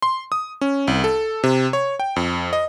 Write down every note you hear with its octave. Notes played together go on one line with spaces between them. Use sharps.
C6
D#6
C#4
C2
A4
C3
C#5
G5
F2
D#5